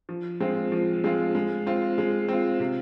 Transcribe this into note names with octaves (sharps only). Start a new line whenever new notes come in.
F3
G#3 C4 F4
F3
G#3 C4 F4
G#3
C4 F4
G#3
C4 F4
C3